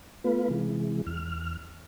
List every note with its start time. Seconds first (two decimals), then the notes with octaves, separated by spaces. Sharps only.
0.24 A3 B3 F4 B4
0.49 C3 E3 G#3
1.07 E2 F6